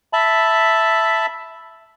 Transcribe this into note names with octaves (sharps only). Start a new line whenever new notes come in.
E5 A5 B5